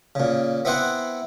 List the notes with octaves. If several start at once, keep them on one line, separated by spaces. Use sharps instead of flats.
A#2 C#3
B3 C4 E4 C5 F#5